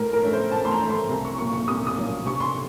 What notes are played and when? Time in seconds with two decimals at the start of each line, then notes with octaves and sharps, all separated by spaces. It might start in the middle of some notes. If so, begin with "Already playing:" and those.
Already playing: A2 A#4
0.13 A#4
0.22 A3 C#4
0.33 C5
0.51 A2 A5
0.65 C6
0.71 A#5
0.80 A3 C#4
0.90 C6
1.09 C2 A#5
1.25 C#6
1.38 A#2 F#3 A#3 C#4 C#6
1.53 C#6
1.68 C2 D#6
1.87 D#6
1.97 A#2 F#3 A#3 C#4
2.25 C3 C#6
2.40 C6